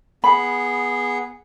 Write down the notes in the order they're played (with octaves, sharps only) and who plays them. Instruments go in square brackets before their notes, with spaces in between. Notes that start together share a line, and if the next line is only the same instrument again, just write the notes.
[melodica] B3 G#4 [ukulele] B5